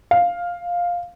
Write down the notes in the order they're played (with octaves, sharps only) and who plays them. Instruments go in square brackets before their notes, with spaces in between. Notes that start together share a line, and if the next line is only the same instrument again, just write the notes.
[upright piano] F5